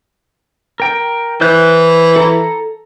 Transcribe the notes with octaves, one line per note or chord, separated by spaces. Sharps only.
A#4 G5
E3 C5 F#6 G6
A4 A#5